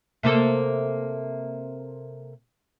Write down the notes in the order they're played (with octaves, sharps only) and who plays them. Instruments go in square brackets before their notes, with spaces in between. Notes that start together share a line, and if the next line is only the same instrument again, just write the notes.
[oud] C3 A#3 A4